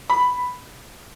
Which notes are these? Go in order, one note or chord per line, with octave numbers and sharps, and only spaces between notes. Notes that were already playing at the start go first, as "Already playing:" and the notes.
B5